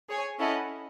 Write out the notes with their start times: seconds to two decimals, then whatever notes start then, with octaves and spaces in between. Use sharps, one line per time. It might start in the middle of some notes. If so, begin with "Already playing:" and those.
0.09 G#4 C#5 G#5
0.39 C#4 E4 A4 D#5 F#5